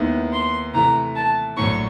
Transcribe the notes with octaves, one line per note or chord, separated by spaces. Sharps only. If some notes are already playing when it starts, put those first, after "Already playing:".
Already playing: D#2 D#3 G#3 B3 E4
C6
C3 E3 A3 A#5
A5
A#1 A2 F#3 C#6